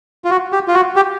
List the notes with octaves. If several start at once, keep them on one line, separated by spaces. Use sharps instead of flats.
F4
F#4
G4
F4
F#4
G4